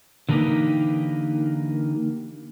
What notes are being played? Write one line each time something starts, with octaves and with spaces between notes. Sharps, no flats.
D3 E3 A#3 D#4 G4